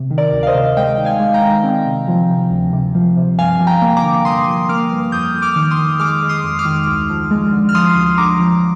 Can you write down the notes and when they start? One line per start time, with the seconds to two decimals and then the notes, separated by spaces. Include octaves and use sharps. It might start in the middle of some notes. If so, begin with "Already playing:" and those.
Already playing: C3
0.11 D#3
0.18 A#4 D5
0.32 D2
0.43 F5
0.47 C5 D#5
0.55 C3
0.77 G#3 D#5 G5
0.98 D#3
1.05 F5 G#5
1.20 G#3
1.34 G5 A#5
1.42 D#3
1.64 C4
1.86 C3
2.08 F3
2.30 C3
2.51 D2
2.73 C3
2.95 F3
3.17 C3
3.38 G2 F5 G#5
3.61 F3
3.67 G5 A#5
3.82 A#3
3.97 A#5 D6
4.03 D3
4.25 G2 C6 D#6
4.47 F3
4.69 A#3 D6 F6
4.91 G2
5.12 F2 D#6 G6
5.35 F2
5.42 D6 F6
5.56 D#3
5.70 C6 D#6
5.79 D#3
6.00 G#3 D6 F6
6.23 G#3
6.29 C6 D#6
6.44 F2
6.59 D6 F6
6.65 D#3
6.87 D2
7.10 F3
7.31 G#3
7.52 D3
7.69 F6
7.75 F3 C6 D#6
7.96 D2
8.18 D3 A#5 D6
8.40 F3